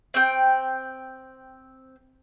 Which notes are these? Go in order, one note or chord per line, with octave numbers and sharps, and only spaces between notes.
C4 G5